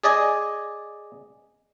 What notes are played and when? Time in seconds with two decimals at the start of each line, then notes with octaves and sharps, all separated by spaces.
0.04 G#4 D5 D#5 G#5